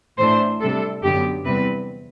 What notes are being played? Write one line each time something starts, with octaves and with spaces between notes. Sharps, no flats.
A2 E3 A3 D4 C5
C3 G3 D4 A4
F#2 D3 F#3 B3 G4
E2 C3 G3 C4 B4